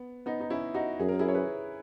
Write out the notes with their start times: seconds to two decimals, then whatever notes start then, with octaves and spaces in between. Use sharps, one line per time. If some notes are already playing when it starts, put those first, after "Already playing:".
Already playing: B3
0.26 B3 D#4
0.41 D#4
0.50 C#4 E4
0.74 D#4 F#4
0.99 F#2 G#4
1.09 A#4
1.19 E4 G#4
1.28 C#5
1.35 G#4 B4